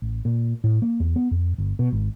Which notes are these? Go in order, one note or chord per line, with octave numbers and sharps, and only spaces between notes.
A1
A#2
A2
A#3
E2
B3
F2
G1
B2
G#1